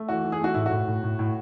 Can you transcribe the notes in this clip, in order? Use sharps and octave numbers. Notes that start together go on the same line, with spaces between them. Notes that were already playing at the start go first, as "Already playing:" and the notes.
Already playing: A3
E3 F#4
E3
G#4
A3 F#4
A2 E4
F#4
A2
A2
A2
A2